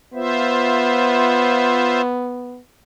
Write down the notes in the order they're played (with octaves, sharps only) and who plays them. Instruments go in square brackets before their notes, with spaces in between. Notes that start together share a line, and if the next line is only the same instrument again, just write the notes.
[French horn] B3 [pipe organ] F4 C5 E5